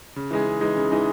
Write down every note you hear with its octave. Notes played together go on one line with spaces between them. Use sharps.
C#3
E3 G#3 D#4 G#4
C#3
E3 G#3 D#4 G#4
C#3
E3 G#3 D#4 G#4